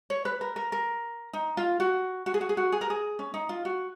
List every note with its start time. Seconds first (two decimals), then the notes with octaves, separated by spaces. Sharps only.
0.10 C#5
0.25 B4
0.41 A#4
0.56 A#4
0.72 A#4
1.33 D#4
1.57 F4
1.80 F#4
2.26 F#4
2.34 G#4
2.41 F#4
2.49 G#4
2.57 F#4
2.72 G#4
2.81 A#4
2.90 G#4
3.19 C#4
3.34 D#4
3.49 F4
3.65 F#4